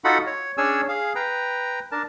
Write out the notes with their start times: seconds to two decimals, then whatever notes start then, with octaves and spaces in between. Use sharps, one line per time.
0.04 D#4 F4 F#4 A4 F#5 B5
0.26 C#5
0.58 C#4 D4 G#4 C#5 G#5 E6
0.89 G#4 F5
1.15 B4 G5 A#5
1.92 D4 A#4 A5